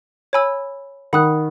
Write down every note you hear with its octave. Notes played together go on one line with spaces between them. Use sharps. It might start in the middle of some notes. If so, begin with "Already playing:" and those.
C#5 G#5 B5 E6
D#3 F#5 B5 D#6 F#6